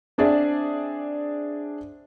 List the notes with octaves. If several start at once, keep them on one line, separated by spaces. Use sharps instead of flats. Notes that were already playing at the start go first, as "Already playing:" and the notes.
C4 D4 G#4 D5 E5